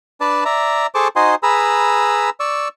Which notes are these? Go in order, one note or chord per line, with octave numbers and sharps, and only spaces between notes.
D4 B4 D5 A5
D5 E5 A#5
G#4 A4 C5 A5 C#6 D6
D#4 F#4 C5 D#5 G#5 C6
G#4 B4 A#5 B5 E6
D5 C#6 E6